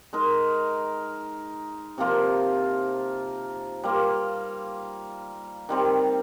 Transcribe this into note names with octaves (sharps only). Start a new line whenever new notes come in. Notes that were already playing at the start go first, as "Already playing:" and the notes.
G#3 D#4 A#4
C3 F3 A#3 F4
G3 A#3 F4
D#3 G3 C4